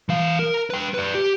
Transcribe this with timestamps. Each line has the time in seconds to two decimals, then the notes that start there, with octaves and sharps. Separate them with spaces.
0.09 E3 F5
0.39 A#4
0.70 B4 G5
0.94 B4 D5
1.14 G4